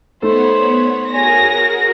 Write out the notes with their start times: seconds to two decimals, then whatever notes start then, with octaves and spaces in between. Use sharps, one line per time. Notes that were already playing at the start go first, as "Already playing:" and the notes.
0.22 A3 B3 D#4 A4 C5 C#5 B5
1.12 F#4 G#4 A#4 C#5 G#5 A#6